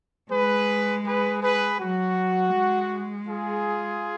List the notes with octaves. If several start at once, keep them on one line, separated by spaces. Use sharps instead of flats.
G#3 G#4 B4
G#4 B4
G#4 B4
F#3 F#4
G#3
F4 G#4